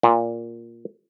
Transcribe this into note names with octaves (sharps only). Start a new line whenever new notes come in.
A#2